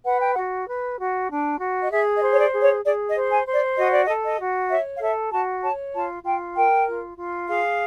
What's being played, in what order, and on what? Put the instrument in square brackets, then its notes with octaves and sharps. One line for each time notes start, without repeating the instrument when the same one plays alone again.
[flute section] B4 F#5
G5
F#5
F#4
B4
F#4
D4
F#4
D#5
G#4 E5
D#5
C5
C#5
D5
G#4
C#5
G#4 D5
D#5
C5
G#5
C5
D5
F#4 D#5
D5
D#5
A4
D#5
F#4
C#5 E5
F5
A4 E5
F#4 A5
C#5 A5
F4 A5
F4 G5
A#4 G5
F4
F4
G#4 F5